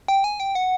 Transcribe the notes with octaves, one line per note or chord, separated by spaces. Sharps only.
G5
G#5
G5
F#5